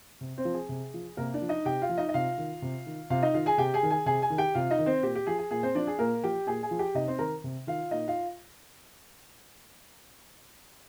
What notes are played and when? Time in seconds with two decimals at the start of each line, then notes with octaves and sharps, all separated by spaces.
0.21 C3
0.38 C4 C5
0.45 F3
0.53 G#4
0.69 C3
0.94 F3
1.17 C3 A#3 A#4
1.34 D4 D5
1.42 F3
1.49 D#4 D#5
1.65 C3 G4 G5
1.82 F4 F5
1.89 F3
1.98 D#4 D#5
2.09 D#5
2.14 C3 F4 F5
2.38 D#3
2.62 C3
2.86 D#3
3.10 C3 F4 F5
3.23 D#4 D#5
3.34 D#3 F4 F5
3.46 G#4 G#5
3.58 C3 G4 G5
3.74 G#4 G#5
3.83 D#3
3.91 G#4 G#5
4.06 C3 G#4 G#5
4.22 G#4 G#5
4.30 D#3
4.38 G4 G5
4.55 C3 F4 F5
4.70 D#4 D#5
4.78 D#3
4.86 C4 C5
5.03 A#2 G4
5.15 G4
5.27 F3 G#4
5.39 G#4
5.51 A#2 G#4
5.63 C4 C5
5.75 F3 D4 D5
5.87 G#4
5.98 A#2 A#3 A#4
6.23 F3 G4 G5
6.46 A#2 G#4 G#5
6.63 G#4 G#5
6.71 F3
6.79 G4 G5
6.95 C3 D#4 D#5
7.08 C4 C5
7.19 D#3 A#4 A#5
7.44 C3
7.67 D#3 F4 F5
7.91 A#2 D#4 D#5
8.08 F4 F5